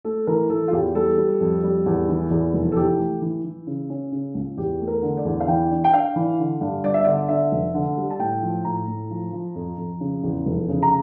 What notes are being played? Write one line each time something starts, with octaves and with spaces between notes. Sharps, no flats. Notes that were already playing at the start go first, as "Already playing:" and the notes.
A3 A4
E3 A#4
E3 A4
F4
E2 G4
G3 A4
G3
F2
G3
E2
E3
E2
F1
A4
E3 G4
A3
E3
E3
C#3
C#4
C#3
C#2
E2 G4
A3
A#4
D3
D5
E2
F5
E3 G5
D4
G5
D4 F5
E3
D3
G2
G1 D5
E5
D3 D5
D3 E5
F1
D3
G3
A5
A2 G5
F3
A2 A#5
A2
F3
F3
F2
F2
C#3
E2
F1
C#3
A#5